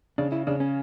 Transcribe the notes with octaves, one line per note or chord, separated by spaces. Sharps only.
C#3 D4
E4
C#3 D4
C#4